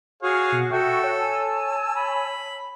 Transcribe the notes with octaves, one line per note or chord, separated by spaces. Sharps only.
F#4 G#4 C#5 F5
B2
F#4 A4 E5 G5 C#6
C#5
G#5 A5 E6
B5